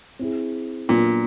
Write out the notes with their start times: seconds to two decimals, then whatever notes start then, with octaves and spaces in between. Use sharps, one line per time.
0.19 C4 E4 G#4
0.89 A#2 F#3 B3 D4